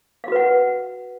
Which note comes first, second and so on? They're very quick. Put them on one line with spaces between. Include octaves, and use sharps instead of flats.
F5 F#4 B4 F#5